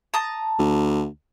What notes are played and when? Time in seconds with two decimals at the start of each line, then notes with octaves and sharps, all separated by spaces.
0.14 A5 A#5 D#6
0.59 D2